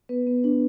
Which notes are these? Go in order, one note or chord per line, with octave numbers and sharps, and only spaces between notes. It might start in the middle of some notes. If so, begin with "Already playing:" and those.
B3 B4
B3
D4